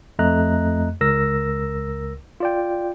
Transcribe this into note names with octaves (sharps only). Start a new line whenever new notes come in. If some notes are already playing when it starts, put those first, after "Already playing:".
F2 A3 D#5 A#5 F#6
C#2 A#4 E6 A#6
F4 D5 G5